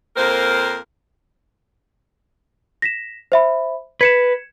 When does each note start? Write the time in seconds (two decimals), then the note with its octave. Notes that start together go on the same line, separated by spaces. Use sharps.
0.17 F2 A#3 C4 A#4 C5
2.82 A#6 B6 E7
3.32 C5 E5 B5
4.01 B4 G#6 C#7 E7